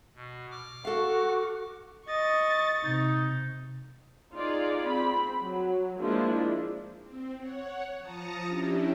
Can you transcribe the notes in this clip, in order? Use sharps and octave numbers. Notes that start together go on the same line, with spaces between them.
B2
D6 F6
F#4 A4 F5
D#5 C#6 A6
C3 D#4
D#4 F4 G#4 D5
C4 B5
F#3
F3 G#3 A#3 D4 E4
C4
C#5 F#5
F3 A5 A#5 D#6 A#6 C#7
C#4 D4 E4 G4